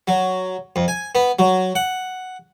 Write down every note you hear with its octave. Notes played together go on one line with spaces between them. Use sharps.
F#3
F2
G#5
B3
F#3
F#5